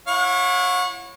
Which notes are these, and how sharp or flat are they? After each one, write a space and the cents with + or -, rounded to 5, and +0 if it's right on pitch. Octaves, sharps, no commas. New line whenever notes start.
E4 +30 C#5 -15 F#5 -40